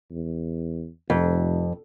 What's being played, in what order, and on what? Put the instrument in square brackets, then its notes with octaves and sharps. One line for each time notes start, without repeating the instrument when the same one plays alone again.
[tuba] E2
[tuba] F1 [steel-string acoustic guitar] F2